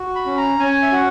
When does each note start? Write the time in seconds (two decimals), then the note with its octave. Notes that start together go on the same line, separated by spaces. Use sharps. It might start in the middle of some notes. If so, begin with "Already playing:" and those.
Already playing: F#4
0.16 B5
0.26 C#4
0.37 A#5
0.59 C#4 G#5
0.82 E5
0.92 F#4 F#5